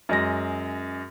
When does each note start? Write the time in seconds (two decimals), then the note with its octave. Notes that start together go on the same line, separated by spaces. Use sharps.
0.09 F#2 G#3 A#6